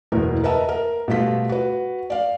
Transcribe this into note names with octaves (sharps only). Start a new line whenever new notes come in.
F#1 E2 B2 A#4
A#4 B4 D#5 E5 A5 A#5
A#4
B2 G3 A3 F4 B6
F#4 B4
D5 F5